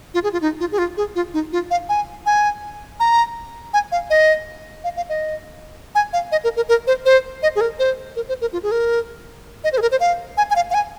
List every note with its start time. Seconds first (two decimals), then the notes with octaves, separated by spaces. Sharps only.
0.14 F4
0.23 G#4
0.33 F4
0.42 D#4
0.60 F4
0.72 G#4
0.78 F4
0.97 G#4
1.15 F4
1.34 D#4
1.52 F4
1.71 F5
1.89 G#5
2.26 G#5
3.00 A#5
3.73 G#5
3.92 F5
4.10 D#5
4.84 F5
4.97 F5
5.09 D#5
5.95 G#5
6.13 F5
6.32 D#5
6.44 A#4
6.56 A#4
6.69 A#4
6.87 C5
7.05 C5
7.43 D#5
7.56 G#4
7.61 A#4
7.79 C5
8.16 A#4
8.29 C5
8.41 A#4
8.53 F4
8.63 G#4
8.71 A#4
9.64 D#5
9.73 C5
9.78 G#4
9.82 A#4
9.91 C5
10.00 F5
10.37 G#5
10.50 G#5
10.56 F5
10.70 F5
10.74 G#5